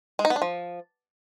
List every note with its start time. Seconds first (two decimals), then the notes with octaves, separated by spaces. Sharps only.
0.19 G#3
0.25 D#4
0.30 B3
0.36 D4
0.42 F3